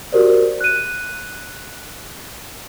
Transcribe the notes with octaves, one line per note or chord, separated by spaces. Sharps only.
F#4 G4 A#4 C5 D5
F#6 D#7